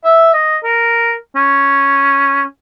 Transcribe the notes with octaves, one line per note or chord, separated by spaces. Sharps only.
E5
D#5
A#4
C#4